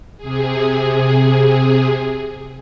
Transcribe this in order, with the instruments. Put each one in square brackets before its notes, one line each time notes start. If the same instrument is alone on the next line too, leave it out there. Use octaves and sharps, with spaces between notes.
[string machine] C3 G#4